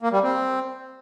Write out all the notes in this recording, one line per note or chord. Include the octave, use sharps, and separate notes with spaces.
A#3
G3
C4